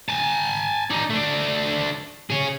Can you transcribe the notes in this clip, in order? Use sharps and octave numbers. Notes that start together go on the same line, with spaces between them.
G#5 A5
D#4 D5
A3 D4
G#4 C#5